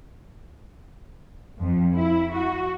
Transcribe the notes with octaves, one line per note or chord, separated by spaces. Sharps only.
F2
E4
F#4